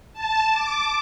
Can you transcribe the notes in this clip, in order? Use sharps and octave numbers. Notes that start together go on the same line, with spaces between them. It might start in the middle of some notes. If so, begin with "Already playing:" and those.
A5
D6